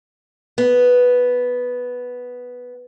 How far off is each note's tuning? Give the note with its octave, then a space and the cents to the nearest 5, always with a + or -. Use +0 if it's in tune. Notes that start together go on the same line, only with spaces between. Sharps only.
B3 +0